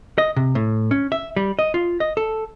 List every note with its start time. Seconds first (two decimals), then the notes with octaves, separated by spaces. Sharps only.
0.18 D#5
0.36 C3
0.55 A2
0.91 C#4
1.12 E5
1.36 G3
1.59 D#5
1.74 F4
2.00 D#5
2.17 A4